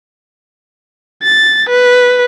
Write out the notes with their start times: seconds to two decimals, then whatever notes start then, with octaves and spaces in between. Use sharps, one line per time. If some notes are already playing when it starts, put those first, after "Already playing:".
1.23 A6
1.69 B4